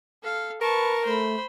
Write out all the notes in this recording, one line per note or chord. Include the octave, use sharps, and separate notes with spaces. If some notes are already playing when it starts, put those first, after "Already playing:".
A4 F5
A#4 B4 A5 C#6
A3 C5 B5